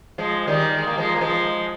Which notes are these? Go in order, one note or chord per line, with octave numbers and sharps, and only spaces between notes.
F3 G#3
D#3 G3
G#3
A#3
F3 G#3
A#3
F3 G#3